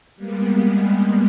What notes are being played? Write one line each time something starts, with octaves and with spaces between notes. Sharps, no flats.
G3 G#3 A#3 B3